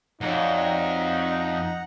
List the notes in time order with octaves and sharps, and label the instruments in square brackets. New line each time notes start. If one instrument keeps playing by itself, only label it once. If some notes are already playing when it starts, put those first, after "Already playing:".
[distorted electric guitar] F2 [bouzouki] C#4 F#4 D5 [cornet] D#4 [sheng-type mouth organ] F#5 A#5